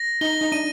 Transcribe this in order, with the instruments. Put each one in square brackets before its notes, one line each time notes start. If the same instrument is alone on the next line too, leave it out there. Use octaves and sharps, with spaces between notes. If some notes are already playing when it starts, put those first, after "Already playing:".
Already playing: [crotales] A#6
[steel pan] D#4 [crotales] G7
[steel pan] D#4
[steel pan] D4 [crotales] D#7